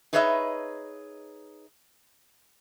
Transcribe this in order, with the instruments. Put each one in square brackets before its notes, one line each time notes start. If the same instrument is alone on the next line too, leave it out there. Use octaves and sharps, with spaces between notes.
[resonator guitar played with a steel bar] D#4 G#4 B4 C#5 D#5 E5